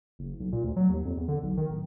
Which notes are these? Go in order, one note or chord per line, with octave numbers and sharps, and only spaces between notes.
F#1
B1
A#2
D2
F#3
D#2
F2
E2
D3
B1
D#3
D1